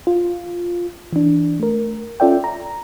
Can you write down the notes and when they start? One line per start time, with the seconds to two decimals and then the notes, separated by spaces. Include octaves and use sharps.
0.07 F4
1.13 E3 D4
1.60 A3 A#4
2.20 C#4 F4 A4 D5 E5 G5
2.44 A#5